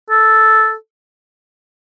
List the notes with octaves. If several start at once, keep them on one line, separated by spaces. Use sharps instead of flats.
A4